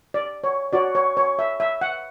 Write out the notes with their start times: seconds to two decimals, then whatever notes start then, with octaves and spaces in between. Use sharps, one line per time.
0.14 D5
0.44 C#5
0.73 F#4 C#5 D5
0.95 C#5
1.17 C#5
1.39 E5
1.60 E5
1.81 F#5